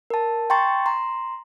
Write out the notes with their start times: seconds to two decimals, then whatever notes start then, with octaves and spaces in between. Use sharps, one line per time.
0.10 A#4 A5
0.50 G5 A#5 C6 C#6 A6
0.86 A#5 C6